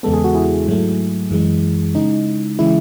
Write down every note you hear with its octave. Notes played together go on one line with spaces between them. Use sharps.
E2 C#3 G#3 B3 A4
G#4
F#4
E4 G#4
G#2 F#3 A3
F#2 E3 G#3
C#3 G#3 D#4
C#3 E3 G#3 E4